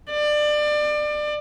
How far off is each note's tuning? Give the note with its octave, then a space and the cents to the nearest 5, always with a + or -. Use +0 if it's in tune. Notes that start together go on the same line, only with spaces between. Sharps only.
D5 +25